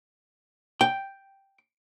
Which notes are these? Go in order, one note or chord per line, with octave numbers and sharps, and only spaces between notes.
G5